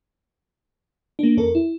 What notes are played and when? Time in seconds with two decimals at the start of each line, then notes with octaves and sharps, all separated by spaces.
1.19 A#3 D4
1.37 F2 C#4 A4 A#4
1.55 E4